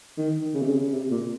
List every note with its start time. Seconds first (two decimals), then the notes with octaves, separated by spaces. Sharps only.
0.17 D#3
0.54 C#3
0.62 C3
0.70 C#3
0.92 C3
1.11 A#2